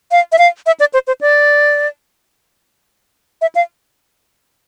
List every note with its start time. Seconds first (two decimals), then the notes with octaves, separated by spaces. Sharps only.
0.11 F5
0.32 E5
0.38 F5
0.66 E5
0.80 D5
0.93 C5
1.07 C5
1.21 D5
3.41 E5
3.55 F5